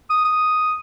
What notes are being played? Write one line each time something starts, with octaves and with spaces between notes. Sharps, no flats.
D#6
D#6